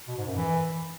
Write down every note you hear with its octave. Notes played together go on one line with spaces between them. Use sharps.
B2
G#2
F#2
E3